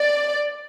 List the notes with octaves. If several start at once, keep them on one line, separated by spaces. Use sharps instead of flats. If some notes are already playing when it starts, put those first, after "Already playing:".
Already playing: D5